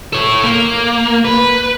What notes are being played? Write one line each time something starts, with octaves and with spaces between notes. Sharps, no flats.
A4 C#5
A#3
B4